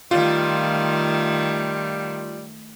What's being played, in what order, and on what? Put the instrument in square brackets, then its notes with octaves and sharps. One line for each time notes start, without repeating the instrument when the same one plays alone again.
[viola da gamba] D#3 A3 [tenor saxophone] G3 [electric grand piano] F4